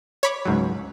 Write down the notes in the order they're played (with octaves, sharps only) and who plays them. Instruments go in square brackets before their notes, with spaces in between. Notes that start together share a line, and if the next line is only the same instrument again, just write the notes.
[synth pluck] C#5 B5 D6
[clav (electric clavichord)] C#2 G#2 F#3